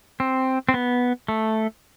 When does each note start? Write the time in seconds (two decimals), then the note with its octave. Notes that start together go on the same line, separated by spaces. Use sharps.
0.20 C4
0.69 C4
0.74 B3
1.28 A3